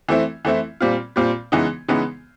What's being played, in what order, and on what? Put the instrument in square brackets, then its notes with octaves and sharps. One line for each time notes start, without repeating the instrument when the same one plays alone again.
[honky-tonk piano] E3 A3 C4 E4
E3 A3 C4 E4
A#2 G3 C4 F4
A#2 G3 C4 F4
C#3 E3 G#3 B3 D#4
C#3 E3 G#3 B3 D#4